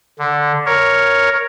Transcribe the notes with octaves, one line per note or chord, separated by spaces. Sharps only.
D3
A#4 C#5